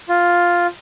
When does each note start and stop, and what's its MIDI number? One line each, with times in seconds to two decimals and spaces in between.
0.09 0.67 65